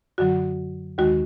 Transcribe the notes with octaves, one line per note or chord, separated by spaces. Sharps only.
F#2 D3 F#3 F#4
D#2 D#3 G#3 F#4